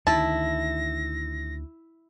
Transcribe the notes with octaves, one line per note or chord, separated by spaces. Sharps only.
D2 D#3 E4 A5 A#6